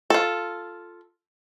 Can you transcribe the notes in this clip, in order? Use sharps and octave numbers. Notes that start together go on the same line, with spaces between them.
F4 A4